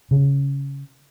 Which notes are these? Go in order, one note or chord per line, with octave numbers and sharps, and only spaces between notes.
C#3